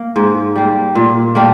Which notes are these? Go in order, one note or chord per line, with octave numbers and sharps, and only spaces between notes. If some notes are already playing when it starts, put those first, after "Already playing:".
Already playing: A#3
G#2
G3 A#3
A#2
G3 A#3 D4